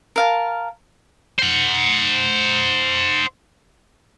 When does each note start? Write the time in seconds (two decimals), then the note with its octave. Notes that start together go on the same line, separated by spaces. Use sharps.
0.16 A#4 F5 A5
1.39 C5 F#5